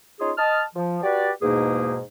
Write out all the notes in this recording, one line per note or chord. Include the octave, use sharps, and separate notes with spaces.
C#4 D#4 F4 G#4
D#5 A5 F6
F3
F#4 G4 B4 D5
E2 G#2 B2 A#3 D#4 G#4